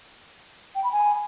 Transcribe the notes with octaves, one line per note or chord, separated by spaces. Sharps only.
G5
B5
G#5